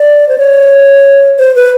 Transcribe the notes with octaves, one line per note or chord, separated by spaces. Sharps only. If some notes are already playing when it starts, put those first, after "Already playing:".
Already playing: D5
C5
C#5
C5
B4